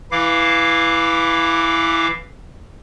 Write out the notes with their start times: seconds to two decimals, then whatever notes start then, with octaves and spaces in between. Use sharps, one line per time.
0.11 E3 E4 F5 D6